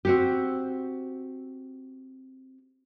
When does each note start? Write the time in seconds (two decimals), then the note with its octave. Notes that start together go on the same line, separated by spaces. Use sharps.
0.05 C4 F#4 G4